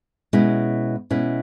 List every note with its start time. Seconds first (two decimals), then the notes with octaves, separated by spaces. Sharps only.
0.33 B2 G#3 C#4 E4
1.10 B2 G#3 C#4 E4